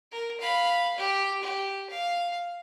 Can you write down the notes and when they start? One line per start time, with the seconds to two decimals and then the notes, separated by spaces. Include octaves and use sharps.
0.12 A#4
0.40 F5 B5
0.98 G4
1.43 G4
1.90 F5